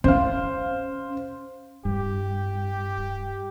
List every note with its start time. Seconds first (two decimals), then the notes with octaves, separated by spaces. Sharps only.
0.04 C#4 C5 F5
1.85 D1 G2 G4